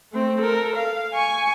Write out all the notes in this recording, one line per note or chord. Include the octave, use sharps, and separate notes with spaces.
A3 C4
A4 A#4
F5
G#5 C#6